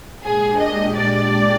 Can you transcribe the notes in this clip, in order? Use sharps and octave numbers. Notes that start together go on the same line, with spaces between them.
A#2 G#3 D4 G4 G#4
D#5
D5